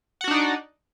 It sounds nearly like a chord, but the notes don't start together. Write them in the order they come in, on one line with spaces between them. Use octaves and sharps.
F#5 F#4 D4 D#4 D5